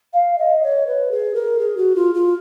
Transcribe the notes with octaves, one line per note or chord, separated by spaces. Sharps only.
F5
D#5
C#5
B4
G#4
A#4
G#4
F#4
F4
F4